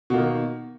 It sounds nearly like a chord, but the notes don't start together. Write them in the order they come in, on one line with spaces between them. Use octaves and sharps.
B2 A#3 D#3